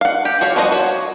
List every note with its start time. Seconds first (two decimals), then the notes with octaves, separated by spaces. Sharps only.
0.01 F5 F#5
0.25 G4
0.41 F#4 G#4 C#5 F5
0.56 F3 G3 F4 F#4 D#5
0.71 F#4 C#5